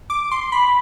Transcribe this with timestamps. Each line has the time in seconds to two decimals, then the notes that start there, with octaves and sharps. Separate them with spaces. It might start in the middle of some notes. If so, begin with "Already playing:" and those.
0.10 D6
0.31 C6
0.52 B5